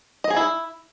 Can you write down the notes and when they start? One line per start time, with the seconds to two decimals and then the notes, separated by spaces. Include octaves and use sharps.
0.24 D#5
0.30 G#4
0.36 E4